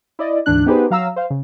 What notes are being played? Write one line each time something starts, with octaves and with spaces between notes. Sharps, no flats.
E4 D5 D#5
D2 G#2 E3 D4 F#6
B3 D#4 G4 G#4 B4 C5
F#3 F5 A#5 E6
C5 F5
C#3